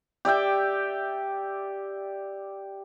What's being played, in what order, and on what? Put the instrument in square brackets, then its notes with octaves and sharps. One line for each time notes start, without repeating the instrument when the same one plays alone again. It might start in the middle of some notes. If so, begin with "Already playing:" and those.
[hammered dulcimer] G4 D5 E5 G5